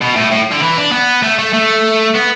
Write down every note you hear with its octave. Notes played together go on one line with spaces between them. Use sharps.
B2
A2
A2
D3
E3
D4
B3
A3
A3
A3
B3